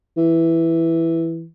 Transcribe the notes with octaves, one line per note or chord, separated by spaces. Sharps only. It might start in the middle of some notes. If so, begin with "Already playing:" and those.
E3